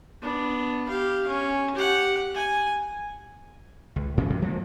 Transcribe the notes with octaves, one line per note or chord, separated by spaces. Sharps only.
B3 D4
G4 F5
C#4
G4 F#5
G#5
C#2
A2 C#3 F3 C#4
F#2
F3 G#3 A#3